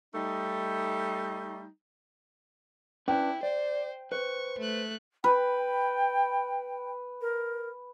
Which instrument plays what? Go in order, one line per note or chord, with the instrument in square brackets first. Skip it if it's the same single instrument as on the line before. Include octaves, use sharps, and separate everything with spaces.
[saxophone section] G3 A3 D#4
[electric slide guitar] C#4 D4 B4 [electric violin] E4 [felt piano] G5
[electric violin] C5 [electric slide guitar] D5
[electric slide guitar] B4 C5 [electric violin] C#6
[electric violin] A3 F#6
[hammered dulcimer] B4 [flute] G5
[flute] A#4